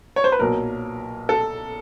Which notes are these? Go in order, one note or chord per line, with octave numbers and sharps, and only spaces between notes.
C#5
C5
B4
B1 A#2 F#3 A#4
A4